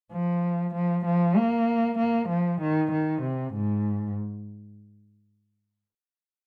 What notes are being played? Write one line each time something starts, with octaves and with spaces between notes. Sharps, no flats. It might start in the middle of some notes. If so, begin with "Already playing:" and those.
F3
F3
F3
A#3
A#3
F3
D#3
D#3
C3
G#2